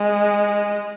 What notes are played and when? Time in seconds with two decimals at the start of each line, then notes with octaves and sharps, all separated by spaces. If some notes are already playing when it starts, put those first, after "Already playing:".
Already playing: G#3